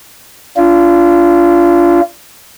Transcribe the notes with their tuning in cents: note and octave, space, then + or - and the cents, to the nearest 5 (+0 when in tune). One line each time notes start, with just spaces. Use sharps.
D4 -25 F4 -25